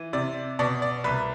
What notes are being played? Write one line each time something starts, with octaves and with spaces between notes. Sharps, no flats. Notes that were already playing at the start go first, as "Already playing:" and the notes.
Already playing: E3
C3 D5
B2 D5
D5
C2 B4